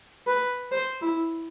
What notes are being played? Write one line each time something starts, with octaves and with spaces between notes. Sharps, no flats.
B4
C5
E4